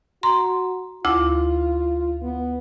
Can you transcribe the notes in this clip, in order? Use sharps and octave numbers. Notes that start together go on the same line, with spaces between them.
F#4 A#5 C6
D2 E4 F4 D6
B3